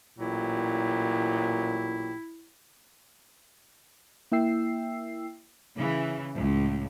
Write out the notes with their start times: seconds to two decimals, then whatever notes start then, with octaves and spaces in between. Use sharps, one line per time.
0.19 A1 A#2 F#3 E4 G4
4.32 A#3 E4 E5 G5 E6 C7
5.77 C#3 E3
6.36 C#2 A2